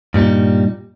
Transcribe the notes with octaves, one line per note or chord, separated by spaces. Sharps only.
G2 A#2 G3 D#4